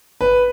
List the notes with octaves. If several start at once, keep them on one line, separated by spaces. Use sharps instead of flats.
B4